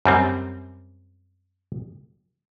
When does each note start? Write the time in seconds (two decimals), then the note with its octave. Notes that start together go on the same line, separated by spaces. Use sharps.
0.05 F#2 G3 C4